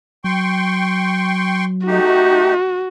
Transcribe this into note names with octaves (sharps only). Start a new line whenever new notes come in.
F#3 G5 C6 C#6
A3 D#4 F#4 G4